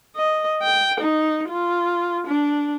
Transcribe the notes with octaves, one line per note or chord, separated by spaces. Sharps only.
D#5
G5
D#4
F4
D4